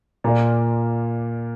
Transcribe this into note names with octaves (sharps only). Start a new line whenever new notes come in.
A#2 A#3 F4 D5